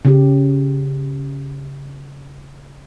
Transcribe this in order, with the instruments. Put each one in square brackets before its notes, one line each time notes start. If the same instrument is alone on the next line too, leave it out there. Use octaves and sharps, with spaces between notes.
[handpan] C#3 C#4 G4